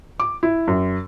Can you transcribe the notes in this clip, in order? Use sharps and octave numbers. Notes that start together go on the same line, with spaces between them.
D6
E4
F#2